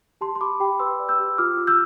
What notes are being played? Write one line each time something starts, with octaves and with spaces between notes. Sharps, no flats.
G4 A5 C6
C6
G4 B5 D6
G4 G5 B5
B4 C6 E6
D5
E6 G6
G4
F4 D6 F6
F4
E6 G6